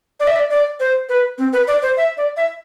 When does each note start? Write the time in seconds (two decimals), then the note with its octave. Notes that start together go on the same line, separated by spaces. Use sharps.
0.20 D5
0.27 E5
0.36 D5
0.50 D5
0.80 C5
1.09 B4
1.38 C4
1.53 B4
1.67 D5
1.82 C5
1.97 E5
2.17 D5
2.37 E5